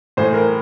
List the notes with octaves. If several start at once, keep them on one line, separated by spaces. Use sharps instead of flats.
A2 E3 C5
A#4